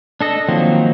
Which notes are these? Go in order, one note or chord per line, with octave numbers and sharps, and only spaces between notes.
D4 A4 D#5
D#3 F3 F#3 A#3 C4